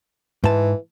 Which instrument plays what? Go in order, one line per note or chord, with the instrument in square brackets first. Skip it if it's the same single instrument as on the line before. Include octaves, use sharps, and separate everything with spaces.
[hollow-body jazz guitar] G#2 A5 [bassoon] E3